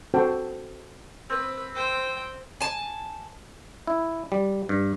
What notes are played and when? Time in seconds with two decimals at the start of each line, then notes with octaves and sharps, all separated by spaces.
0.14 C4 F#4 A4 C5 G5
1.30 C4 B4
1.75 C5 G5
2.60 G#5 A5
3.87 E4
4.32 G3
4.69 G2